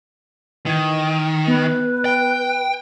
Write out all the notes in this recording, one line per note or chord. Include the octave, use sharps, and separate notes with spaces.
D#3 E3 G#6
B3 B4
G5